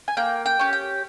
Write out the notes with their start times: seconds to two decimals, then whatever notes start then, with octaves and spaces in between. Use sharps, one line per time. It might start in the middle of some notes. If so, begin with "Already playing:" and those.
0.08 G#5
0.17 A#3 G5
0.46 G5
0.59 C#4 G4
0.73 G5